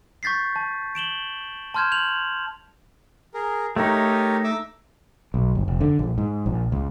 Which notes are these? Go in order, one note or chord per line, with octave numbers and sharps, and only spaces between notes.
C#6 G6 A6 B6 C7
A5
D7 E7 F#7 G7
A5 C6 F6 G6 G#6 E7
G6 F7 F#7
G#4 A#4
A3 D#4 G4 A#4 C#5
E5 D6 E6
B1
G1
F1
D3
A#1
G#2
A#1
C#2